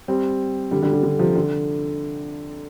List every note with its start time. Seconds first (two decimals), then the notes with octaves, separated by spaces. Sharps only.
0.08 G3 C4
0.71 D3 G3
0.83 D3 G3
0.93 D3
1.03 D3
1.19 C3 F3
1.35 D3